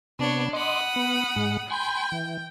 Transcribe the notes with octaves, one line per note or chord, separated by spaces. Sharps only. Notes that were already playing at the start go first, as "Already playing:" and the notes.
C3 B3 D4 C#5
D#5 F#5 B5 C6 D6 D#6
B3
G#2 G#3
G5 G#5 B5 C6
E3